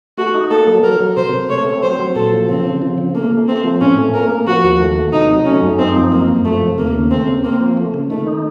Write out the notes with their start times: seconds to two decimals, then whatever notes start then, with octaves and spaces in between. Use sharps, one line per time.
0.18 A3 F#4
0.34 D#4
0.50 A#3 A4
0.67 F#3
0.83 F#3 A#4
1.00 F#3
1.17 C3 C5
1.33 C3
1.50 A3 C#5
1.66 C4
1.83 F#3 C5
1.99 F#3
2.16 A#2 A4
2.32 F3
2.48 C#3 C4
2.65 C#3
2.82 F3
2.98 C#3
3.15 A3 A#3
3.31 A3
3.48 A3 C4
3.64 F3
3.81 A2 C#4
3.98 A3
4.14 A#3 A#4
4.30 A#3
4.47 F3 F#4
4.63 D#2
4.80 A3
4.96 A3
5.13 C3 D#4
5.30 F#3
5.46 A3 C#4
5.62 F#2
5.79 C4 D#4
5.95 F3
6.12 F#2 A#3
6.28 F#2
6.45 F3 A3
6.62 C3
6.78 D#2 A#3
6.95 C#3
7.11 A3 C4
7.28 C#3
7.44 A#3 C4
7.61 F3
7.77 A3
7.94 C#3
8.10 D#3 A3
8.27 D#4